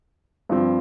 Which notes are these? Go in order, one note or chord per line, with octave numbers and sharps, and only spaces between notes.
G2 F3 C4